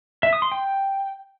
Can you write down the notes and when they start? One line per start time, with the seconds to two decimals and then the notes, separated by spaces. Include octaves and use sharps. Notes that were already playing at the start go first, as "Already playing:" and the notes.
0.23 E5
0.33 D#6
0.42 C6
0.52 G5